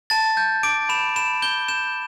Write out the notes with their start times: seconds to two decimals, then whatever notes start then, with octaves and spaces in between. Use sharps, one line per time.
0.10 A5 A6
0.37 G6
0.63 D6 D7
0.89 B5 E7
1.16 B5 E7
1.42 G6 G7
1.68 G6 E7